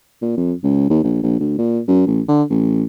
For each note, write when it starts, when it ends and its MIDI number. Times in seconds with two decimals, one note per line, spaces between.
0.22 0.33 46
0.37 0.53 41
0.63 0.88 37
0.90 0.99 39
1.04 1.22 34
1.23 1.38 34
1.39 1.55 38
1.58 1.80 46
1.88 2.04 42
2.07 2.21 33
2.28 2.43 50
2.50 2.83 33